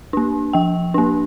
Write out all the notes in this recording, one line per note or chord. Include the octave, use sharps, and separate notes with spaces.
A#3 D4
F3 G5
A#3 D4